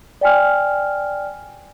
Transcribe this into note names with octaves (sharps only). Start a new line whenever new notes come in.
D5 G5 G#5 F6